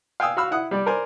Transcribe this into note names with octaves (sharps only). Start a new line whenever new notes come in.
F5 G5 G#5 D#6 E6
F#4 F5 B5 E6 F6
E4 F#5 D#6
G3 D5
A#4 C5 D5 G#5